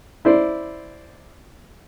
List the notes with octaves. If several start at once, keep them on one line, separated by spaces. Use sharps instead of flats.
E4 C5 D5